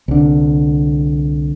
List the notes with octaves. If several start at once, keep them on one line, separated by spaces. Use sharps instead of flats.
C2 D3